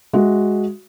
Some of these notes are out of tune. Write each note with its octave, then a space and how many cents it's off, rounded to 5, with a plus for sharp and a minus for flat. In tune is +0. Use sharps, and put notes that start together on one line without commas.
G#3 +0 F#4 +0 E5 +0